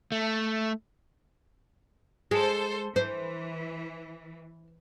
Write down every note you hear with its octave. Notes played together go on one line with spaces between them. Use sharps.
A3
G#3 A4 C5
E3 C5